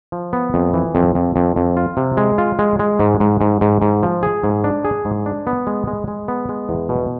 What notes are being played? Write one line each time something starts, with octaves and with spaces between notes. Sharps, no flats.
F3
B3
F2
E3
F2
F2
F2
F2
F4
C3
G#3
F4
G#3
G#3
G#2
G#2
G#2
G#2
G#2
F3
G#4
G#2
D4
G#4
G#2
D4
B3
G#3
G#3
G#3
B3
G#3
E2
B2